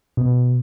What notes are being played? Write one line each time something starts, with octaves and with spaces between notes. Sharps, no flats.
B2